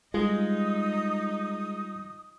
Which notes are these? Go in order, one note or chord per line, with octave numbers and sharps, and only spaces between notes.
G3 G#3 D#4 F4 D#6